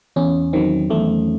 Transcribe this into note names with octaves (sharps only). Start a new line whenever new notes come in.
E2 C#4
D#3 F#3 C4
E2 A3